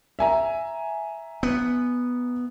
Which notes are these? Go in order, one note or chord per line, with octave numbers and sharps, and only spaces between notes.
E5 G#5 A#5
B3